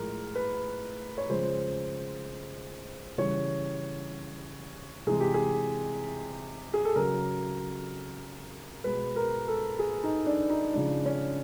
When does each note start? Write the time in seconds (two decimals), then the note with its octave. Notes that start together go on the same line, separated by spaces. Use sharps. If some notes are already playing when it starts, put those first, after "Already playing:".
Already playing: A2 F3 G#3 A#4
0.35 B4
1.18 C#5
1.29 C#3 F3 G#3 C5
3.18 C#3 E3 G3 C#5
5.07 C3 E3 G#3 G#4
5.20 G4
5.34 G#4
6.74 G#4
6.85 A4
6.95 C#3 F#3 A#4
8.84 B2 G#3 B4
9.16 A#4
9.48 A4
9.79 G#4
10.03 D#4
10.26 D4
10.50 D#4
10.73 C#3 F3 G#3 D4
11.05 C#4